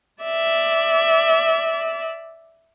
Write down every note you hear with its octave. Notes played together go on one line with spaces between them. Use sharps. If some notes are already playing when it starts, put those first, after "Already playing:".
D5 E5